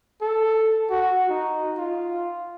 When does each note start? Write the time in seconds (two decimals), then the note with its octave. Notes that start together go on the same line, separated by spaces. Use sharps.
0.22 A4
0.91 F#4
1.29 D#4
1.77 F4